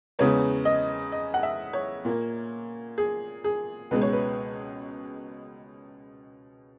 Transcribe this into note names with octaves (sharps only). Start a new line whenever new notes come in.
E2 C#3 G#3 B3 C#5
D#5
D#5
F#5
E5
C#5
A#2 A#3
G#4
G#4
C#2 B2 G#3 B4
C#5
B4